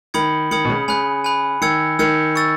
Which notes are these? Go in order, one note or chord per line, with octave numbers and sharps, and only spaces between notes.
D#3 B5 D#6 G#6 C#7 F#7
D#3 B5 D#6 G#6 C#7 F#7
B2
C#3
C#3 G#5 B5 F#6
G#5 B5 F#6
D#3 E6 G#6 C#7
D#3 E6 G#6 C#7
C#6 E6 A6